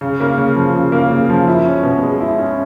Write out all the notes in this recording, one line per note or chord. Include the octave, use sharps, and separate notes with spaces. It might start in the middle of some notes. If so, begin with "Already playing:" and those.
C#3
A#3
C#3
F3
C#3
A#3
C#3
F3
E4
C#4
B2
G#3
E4
C#4